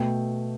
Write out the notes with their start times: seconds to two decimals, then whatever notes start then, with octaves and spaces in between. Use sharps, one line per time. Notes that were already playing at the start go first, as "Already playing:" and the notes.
Already playing: B2 A3 G5